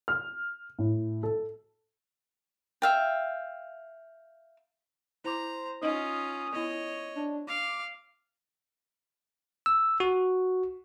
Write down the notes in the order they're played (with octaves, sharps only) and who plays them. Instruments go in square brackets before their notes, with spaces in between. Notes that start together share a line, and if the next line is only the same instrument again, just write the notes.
[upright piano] F6
A2
A4
[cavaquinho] E5 F5 G5
[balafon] E4 D6 [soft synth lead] C5 [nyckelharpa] A#5
[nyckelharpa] C#4 F4 [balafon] D#4 D#5 [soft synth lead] D#6
[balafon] B3 E4 [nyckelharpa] C#5 D#5
[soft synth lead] D4
[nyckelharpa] F5 [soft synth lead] D6
[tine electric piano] E6
F#4